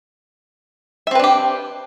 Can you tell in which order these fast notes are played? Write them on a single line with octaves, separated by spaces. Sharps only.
E5 C4 B4 D4 G4